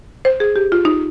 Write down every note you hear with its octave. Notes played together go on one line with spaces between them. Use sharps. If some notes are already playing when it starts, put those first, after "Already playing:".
C5
G#4
G4
F4
D#4